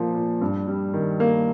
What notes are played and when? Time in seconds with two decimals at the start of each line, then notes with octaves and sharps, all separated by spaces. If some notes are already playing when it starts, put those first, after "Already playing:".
Already playing: A#2 F3 A#3
0.15 A#2
0.41 G2
0.67 G3
0.94 D#3
1.20 A#3